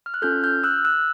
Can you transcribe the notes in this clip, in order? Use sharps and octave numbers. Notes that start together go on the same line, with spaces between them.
F6
F#6
C#4 F4 A4 F6 G6
F6 G6
E6 F#6
E6 F#6